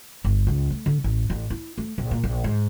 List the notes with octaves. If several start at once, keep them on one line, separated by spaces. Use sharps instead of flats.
G1
C#2
A3
D3
A1
A1
E4
A3
A#1
A#2
A#1
G#2